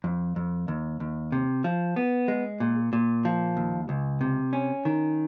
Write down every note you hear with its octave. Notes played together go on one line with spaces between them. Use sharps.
F2
F2
D#2
D#2
C3
F3
B3
G#3
A#2
A#2
F3
D#2
C#2
C3
C#4
D#3